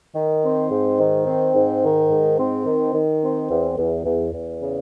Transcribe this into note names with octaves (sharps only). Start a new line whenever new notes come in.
D#3
C4
G#2
D#3
C4
G#2
D#3
G#2
C4
D#3
D#3
C4
E2
E2
E2
E2
C#3